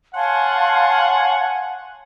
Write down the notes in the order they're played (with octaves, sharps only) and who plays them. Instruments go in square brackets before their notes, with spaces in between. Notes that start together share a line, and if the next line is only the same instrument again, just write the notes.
[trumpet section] C#5 F#5 G#5 [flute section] F5 A5 C6